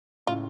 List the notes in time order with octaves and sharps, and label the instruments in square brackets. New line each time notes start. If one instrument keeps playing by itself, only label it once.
[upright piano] A2 C#3 [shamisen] F4